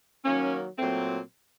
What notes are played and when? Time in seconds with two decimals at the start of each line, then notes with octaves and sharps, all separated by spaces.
0.25 D#3 F#3 A#3 C#4
0.79 A#2 F#3 A3 C4